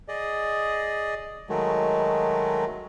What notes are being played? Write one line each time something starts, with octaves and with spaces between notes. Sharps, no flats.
G#4 D5 D#5
D#3 F#3 G#3 A3